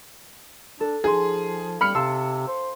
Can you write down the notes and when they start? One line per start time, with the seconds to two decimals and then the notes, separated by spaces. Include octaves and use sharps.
0.80 D4 A4
1.04 F3 D#4 G#4 C6
1.81 G3 B5 F6 C#7
1.95 C3 F5 A5 C6 E6
2.48 C5